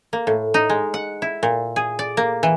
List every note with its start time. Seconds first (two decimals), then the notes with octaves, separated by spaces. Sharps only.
0.13 A#3
0.27 A2
0.54 D#4
0.70 G#3
0.94 F#5
1.22 E4
1.43 A#2
1.76 G#4
1.99 D5
2.17 A#3
2.43 E3